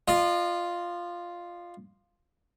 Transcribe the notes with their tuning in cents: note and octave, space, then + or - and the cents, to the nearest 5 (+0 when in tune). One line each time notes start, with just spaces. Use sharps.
F4 +0 D#5 -40